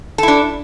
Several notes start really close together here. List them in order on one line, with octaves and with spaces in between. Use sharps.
A4 E4 D4